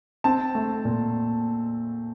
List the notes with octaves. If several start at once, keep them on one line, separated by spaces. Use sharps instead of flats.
C4 A5
A3
A#2